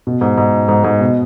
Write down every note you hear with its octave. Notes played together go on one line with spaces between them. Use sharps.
B2
G#2
G#2
G#2
G#2
B2